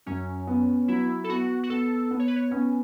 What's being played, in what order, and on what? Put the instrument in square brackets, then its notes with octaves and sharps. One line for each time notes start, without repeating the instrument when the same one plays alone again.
[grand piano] F#2 [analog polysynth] C#4
[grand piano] B3
[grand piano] F#3 [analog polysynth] E4
[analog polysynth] A4
[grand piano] B3 [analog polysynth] F#4
[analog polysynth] F#4
[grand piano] B3 [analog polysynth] A4
[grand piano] B3
[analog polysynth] C#5
B4
C#5
[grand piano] B3 [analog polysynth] C#4